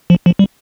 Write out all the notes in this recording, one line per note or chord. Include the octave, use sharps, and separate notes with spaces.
F3
F3
G3